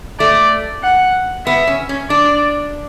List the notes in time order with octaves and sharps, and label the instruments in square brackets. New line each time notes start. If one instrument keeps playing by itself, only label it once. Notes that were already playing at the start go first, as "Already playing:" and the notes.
[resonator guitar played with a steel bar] A3 [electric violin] D5
[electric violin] F#5
[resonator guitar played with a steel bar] B3 [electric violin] E5
[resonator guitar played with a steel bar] C#4
C#4
[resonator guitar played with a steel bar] D4 [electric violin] D5